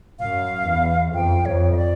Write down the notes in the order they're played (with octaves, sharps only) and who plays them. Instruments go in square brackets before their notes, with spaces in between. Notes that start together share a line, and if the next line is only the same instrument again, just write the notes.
[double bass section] F#2 [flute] F5
[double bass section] E2
[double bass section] F2 [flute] G5
[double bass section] F2 [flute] C#5
[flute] D#5
D5